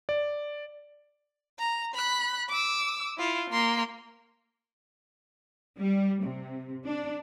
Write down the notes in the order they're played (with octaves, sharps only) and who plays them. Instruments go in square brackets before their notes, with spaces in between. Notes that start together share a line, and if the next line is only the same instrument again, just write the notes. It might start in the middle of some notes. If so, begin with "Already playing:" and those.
[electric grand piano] D5
[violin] A#5
B5 F#6
D6 E6
E4 F4
A#3 C6
[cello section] G3
C3
D4